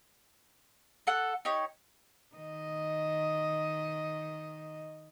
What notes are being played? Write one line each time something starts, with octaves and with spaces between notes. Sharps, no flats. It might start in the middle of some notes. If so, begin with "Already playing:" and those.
A4 F#5 F#6
D#4 G4 C#5
D#3 D#5